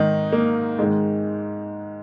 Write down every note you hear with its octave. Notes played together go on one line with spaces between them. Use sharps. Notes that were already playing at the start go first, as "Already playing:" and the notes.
Already playing: G#2 D#3 D#4
A#3
G#2 D#3 G#3